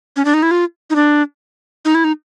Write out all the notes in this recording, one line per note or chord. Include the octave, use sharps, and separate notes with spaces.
C#4
D4
D#4
E4
F4
D#4
D4
D#4
E4
D#4